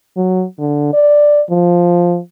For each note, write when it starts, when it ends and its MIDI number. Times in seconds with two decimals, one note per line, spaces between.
0.17 0.45 54
0.59 0.90 50
0.93 1.41 74
1.50 2.19 53